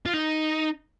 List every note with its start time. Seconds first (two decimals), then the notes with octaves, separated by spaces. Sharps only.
0.06 F4
0.13 D#4